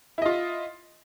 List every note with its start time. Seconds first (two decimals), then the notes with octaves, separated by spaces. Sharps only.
0.18 E4
0.22 D#5
0.26 F4